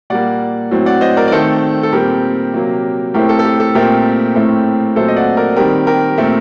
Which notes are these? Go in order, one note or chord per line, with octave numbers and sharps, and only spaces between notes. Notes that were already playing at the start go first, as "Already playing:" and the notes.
A#2 G3 A#3 D5 F#5
A2 F#3 C4
D5 F#5
C5 D#5
A#4 D5
D5
D#3 A3 C4 A4 C5
A4
A#2 G3 C4 G4 A#4
C3 F#3 A#3
A2 A3 C4 G4 A#4
A4
A4
G4
A4
A#2 A3 C4 G4 A#4
A2 A3 C4
A#2 F#3 A3 C4 A4 C5
D#5
D5 F#5
A#4 D5
D#3 G3 C4 G4 A#4
G4 A#4
A#2 A3 C4